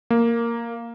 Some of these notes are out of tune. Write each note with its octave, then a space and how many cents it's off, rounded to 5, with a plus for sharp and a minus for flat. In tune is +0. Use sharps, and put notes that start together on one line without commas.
A#3 -5